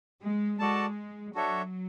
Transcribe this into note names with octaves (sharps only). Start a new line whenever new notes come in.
G#3
G#3 F#4 A4 D5 A5
F#3 D4 F#4 A4 C#5 E5